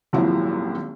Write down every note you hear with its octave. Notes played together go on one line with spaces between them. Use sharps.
D#1 G#1 F3 F#3 E4